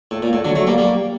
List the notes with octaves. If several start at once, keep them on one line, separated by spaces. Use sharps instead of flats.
A2
A#2
A2
D3 F#3
F#3 A3
G3 A#3
G3 A#3